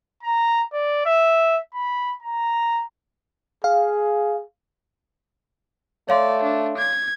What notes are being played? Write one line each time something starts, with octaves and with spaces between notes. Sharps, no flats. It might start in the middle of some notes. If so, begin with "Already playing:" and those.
A#5
D5
E5
B5
A#5
G#4 F5
A3 C#5 D5 F5 C6
D4
G#6